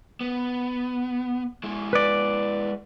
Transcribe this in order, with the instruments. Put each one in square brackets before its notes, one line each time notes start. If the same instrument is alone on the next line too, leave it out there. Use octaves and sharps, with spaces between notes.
[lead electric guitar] B3
G#3 E4
[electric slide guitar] B4 D5